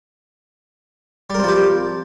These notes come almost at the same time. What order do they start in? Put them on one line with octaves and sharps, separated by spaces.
G3 A#4 C4 F3 G4